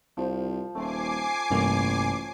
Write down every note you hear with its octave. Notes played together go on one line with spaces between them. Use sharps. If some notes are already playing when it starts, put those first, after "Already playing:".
C2 F3 C5
D#1 A3 G#5 C6 D6 C7
A1 G2 C3 A#3 C#5 G5